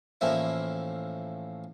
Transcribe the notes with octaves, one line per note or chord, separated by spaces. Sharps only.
A1 A2 F3 A#3 E4 E5